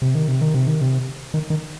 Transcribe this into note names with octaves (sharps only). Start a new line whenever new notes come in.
C3
D#3
C3
D#3
C3
D#3
C3
D#3
D#3